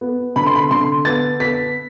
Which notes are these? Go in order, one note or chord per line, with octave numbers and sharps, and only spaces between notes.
B3
D3 B5
C6
B5
D3 C6
B3 A6
B3 B6